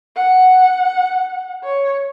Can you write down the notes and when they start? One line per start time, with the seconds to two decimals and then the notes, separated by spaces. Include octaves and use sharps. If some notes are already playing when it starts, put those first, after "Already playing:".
0.16 F#5
1.64 C#5